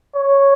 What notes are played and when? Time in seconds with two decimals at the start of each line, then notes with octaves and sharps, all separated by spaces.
0.16 C#5